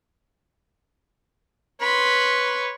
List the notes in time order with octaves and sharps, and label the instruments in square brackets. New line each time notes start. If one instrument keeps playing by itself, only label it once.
[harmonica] B4 C#5 [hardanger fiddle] B5 C6